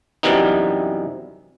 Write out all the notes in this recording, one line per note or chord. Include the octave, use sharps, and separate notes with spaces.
F#2 C3 E3 G3 B3 D#4